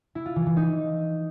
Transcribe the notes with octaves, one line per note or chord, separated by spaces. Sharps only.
E4
F4
E3
E3
D#4